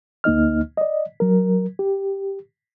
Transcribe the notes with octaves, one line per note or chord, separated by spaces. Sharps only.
D2 A#3 D#4 D#5 F6
D5 D#5
F#3 A#4
G4